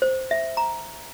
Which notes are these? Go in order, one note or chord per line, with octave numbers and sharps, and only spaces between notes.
C5
E5
A#5